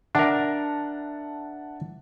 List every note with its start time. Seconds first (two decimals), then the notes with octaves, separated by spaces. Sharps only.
0.15 D4 A#4 E5 F#5 A5